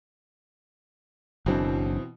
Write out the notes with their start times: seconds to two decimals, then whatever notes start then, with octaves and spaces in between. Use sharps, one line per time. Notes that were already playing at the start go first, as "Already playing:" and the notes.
1.46 F#1 B2 E3 F#3 C4 D4